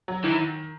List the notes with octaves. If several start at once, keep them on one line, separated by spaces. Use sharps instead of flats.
F#3
D#3 E3